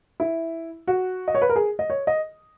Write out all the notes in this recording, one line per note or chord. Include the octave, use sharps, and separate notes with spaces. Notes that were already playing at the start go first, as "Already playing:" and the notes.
E4
F#4
D#5
C#5
B4
A#4
G#4
D#5
C#5
D#5